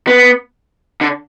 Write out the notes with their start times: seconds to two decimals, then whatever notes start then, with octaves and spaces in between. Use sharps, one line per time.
0.07 B3
1.01 D3